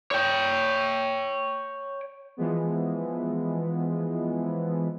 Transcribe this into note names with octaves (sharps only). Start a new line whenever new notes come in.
C#5 G5
E3 F3 G#3 B3